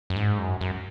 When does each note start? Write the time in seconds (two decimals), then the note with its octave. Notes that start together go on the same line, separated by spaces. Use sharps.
0.10 F#2
0.16 G#2
0.39 F#2
0.61 F#2